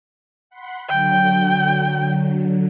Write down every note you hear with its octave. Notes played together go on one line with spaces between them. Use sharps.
F#5 B5 C6
D3 F#3 G5